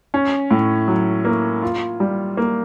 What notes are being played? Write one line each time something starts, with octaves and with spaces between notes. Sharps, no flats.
C#4
A2
F#3
A#3
F4
G3
A#3